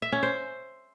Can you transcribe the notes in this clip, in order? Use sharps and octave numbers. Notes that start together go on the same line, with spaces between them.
E5
C#4
C5